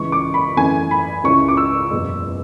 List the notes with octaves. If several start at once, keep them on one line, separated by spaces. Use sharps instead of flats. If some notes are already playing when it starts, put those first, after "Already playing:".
Already playing: C#2 C#3 E3 G#3 C#6
D6
B5
F#2 E3 A3 G#5
B5
C#2 C#3 G#3 C#4 E4 C#6
D6
E6
F#1 E2 B2 G#3